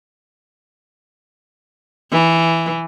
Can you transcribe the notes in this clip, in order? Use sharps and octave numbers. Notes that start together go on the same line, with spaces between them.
E3